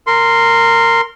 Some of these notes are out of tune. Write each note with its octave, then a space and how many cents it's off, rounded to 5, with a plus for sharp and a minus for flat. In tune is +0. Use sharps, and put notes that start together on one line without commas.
A#4 -15 C6 +0